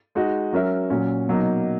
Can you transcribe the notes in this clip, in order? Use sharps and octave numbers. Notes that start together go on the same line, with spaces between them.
G#3 D#4 F#4
F#3 C#4 F#4 A#4 E5
A#2 F#3 C#4
B2 F#3 A#3 D#4